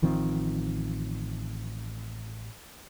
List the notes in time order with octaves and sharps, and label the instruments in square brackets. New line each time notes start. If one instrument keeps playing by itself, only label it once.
[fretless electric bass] A1 D#3 F3 C4